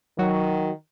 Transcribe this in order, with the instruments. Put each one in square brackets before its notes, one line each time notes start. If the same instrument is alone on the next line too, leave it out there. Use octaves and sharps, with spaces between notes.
[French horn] D#3 [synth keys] F#3 F#4